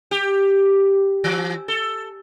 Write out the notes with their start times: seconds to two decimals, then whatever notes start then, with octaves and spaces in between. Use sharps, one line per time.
0.11 G4
1.24 E3
1.68 A4